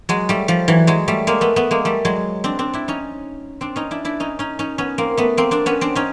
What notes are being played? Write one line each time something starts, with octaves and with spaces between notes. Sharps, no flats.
F#3 G#3
G3 A3
F3 G3
E3 F#3
F#3 G#3
G3 A3
G#3 A#3
A3 B3
A3 B3
G#3 A#3
G3 A3
F#3 G#3
C4 D4
C4 D4
D4 E4
C#4 D#4
C4 D4
C#4 D#4
D4 E4
D4 E4
C#4 D#4
C#4 D#4
C#4 D#4
B3 C#4
A#3 C4
A3 B3
A#3 C4
C4 D4
B3 C#4
C4 D4
C#4 D#4